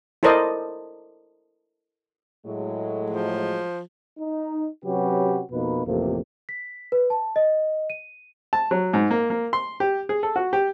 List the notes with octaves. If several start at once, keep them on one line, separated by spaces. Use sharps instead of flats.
E4 A4 A#4 C5 D5 D#5
A2 F#3 G#3 A3
F3
D#4
C3 F#3 C#4 F#4 G4 B4
F2 B2 A#3 D#4 B4
A1 F2 C3 A#3
B6
B4
A5
D#5
D#7
A5
F#3
G#2
A#3
A#3
C6
G4
G#4
A4
F#4
G4